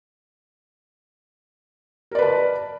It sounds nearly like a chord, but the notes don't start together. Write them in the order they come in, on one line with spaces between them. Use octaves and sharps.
A#4 D5 B4 A5